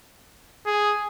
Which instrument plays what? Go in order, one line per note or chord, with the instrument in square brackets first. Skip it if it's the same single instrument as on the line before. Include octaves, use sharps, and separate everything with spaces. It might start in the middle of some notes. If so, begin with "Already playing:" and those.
[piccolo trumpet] G#4